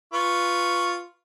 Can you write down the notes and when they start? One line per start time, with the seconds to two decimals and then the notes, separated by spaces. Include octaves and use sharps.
0.13 F4 B4 C#6